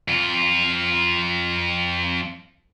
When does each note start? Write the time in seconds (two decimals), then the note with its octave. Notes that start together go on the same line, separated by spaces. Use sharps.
0.08 F2 F4